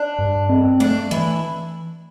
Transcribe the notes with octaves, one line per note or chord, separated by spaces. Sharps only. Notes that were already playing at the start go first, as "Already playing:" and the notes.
Already playing: D4
G2
C4
A3 D4
E3 E4